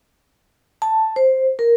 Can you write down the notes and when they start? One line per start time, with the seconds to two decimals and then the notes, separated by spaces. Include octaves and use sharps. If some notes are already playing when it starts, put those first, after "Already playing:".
0.82 A5
1.16 C5
1.59 A#4